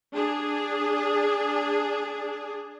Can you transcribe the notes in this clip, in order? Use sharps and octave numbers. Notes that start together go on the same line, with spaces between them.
D4 G#4